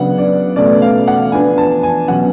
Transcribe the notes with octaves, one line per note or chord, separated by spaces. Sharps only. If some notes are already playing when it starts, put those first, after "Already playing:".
Already playing: C#3 F#3 B3 D4 F#5
D5
B2 A3 C#4 D5
F5
F#5
F3 B3 D4 G#5
A5
G#5
B2 F#3 C#4 F#5